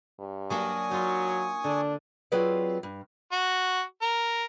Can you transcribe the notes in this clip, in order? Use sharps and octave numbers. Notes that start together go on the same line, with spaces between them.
G2
F#3 A#3 D4 G#5 C#6 D#6
F#3 D#4 F4 D#5
D3 D4
F#3 C4 F4 G#4 B4 D5
G2
F#4
A#4